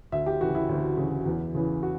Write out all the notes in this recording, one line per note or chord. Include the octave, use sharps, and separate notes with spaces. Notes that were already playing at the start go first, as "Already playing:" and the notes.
D2 E5
G4
C#3 E3 F#4
E4
D2
C#3 E3
E2
C#3 E3
F#4